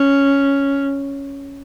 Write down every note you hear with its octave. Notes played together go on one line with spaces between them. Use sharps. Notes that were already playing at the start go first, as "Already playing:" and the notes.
Already playing: C#4